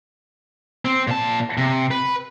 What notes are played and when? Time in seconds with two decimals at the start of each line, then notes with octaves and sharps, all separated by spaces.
0.85 C4
1.07 A#2 A5
1.57 C3
1.91 B4